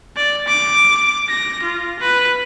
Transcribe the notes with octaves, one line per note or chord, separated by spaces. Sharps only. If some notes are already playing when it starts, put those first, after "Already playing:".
D5
D6
A#6
F4
B4